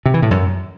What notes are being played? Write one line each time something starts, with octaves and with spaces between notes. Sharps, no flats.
C3
E3
A2
F#2